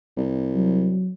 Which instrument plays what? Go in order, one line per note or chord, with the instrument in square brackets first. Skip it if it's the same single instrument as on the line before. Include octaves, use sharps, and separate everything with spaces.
[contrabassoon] C2
[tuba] F#3